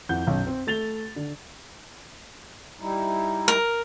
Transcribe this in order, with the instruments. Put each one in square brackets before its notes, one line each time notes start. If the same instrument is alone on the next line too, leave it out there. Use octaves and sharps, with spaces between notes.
[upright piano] F2 E4 F#5 G6
B1 F#2
C4
A3 A6 F7 G7
D3
[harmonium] G3 D#4 E4
[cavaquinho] A#4